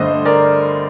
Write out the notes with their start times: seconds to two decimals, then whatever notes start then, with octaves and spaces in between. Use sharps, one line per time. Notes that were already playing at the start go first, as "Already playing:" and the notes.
Already playing: G2 D3 A3 D4 C5 D#5
0.25 A#4 D5